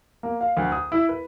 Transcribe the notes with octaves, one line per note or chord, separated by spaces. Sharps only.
A#3
F5
D2
D#6
E4
B4